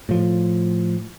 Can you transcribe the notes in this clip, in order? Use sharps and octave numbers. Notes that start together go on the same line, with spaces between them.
A2 F3